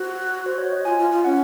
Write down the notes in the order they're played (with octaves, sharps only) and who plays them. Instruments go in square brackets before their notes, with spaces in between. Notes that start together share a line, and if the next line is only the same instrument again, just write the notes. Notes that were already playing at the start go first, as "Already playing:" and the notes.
Already playing: [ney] F#4 [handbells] C5
[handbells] C5
C#5
D#5
[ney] F4 [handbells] G#5
[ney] F4
F4
[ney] C#4 [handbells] F#5